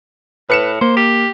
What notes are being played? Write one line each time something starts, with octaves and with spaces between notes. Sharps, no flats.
A2 B4 C#7 E7
A#3 C5
G4